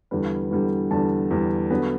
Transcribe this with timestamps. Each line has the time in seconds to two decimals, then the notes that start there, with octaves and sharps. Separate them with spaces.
0.11 E2 D3 G3 B4
0.51 E2 D3 G3
0.91 E2 D3 G3 A5
1.31 E2 D3 G3
1.70 D3 F#3 B3